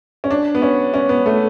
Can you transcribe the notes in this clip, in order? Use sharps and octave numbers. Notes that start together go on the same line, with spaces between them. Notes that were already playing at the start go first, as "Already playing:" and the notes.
C#4
D4
B3
C#4
C#4
B3
A3